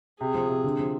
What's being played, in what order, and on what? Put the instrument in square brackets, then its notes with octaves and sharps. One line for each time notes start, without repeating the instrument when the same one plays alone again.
[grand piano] C3 [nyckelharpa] G#4
[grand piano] F3
C3
D3
F3